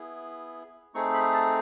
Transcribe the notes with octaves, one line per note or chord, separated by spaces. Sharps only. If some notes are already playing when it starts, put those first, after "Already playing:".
Already playing: B3 E4 G#4
A3 C4 D#4 G#4 C#6
B5
A5